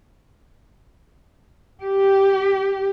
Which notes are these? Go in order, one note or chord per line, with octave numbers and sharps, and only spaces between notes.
G4